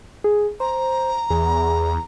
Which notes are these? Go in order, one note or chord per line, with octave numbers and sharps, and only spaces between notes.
G#4
C5 A#5
E2 G#4